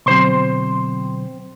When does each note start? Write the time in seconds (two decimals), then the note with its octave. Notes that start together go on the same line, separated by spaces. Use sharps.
0.06 B2 D3 F#3 C4 C5 C6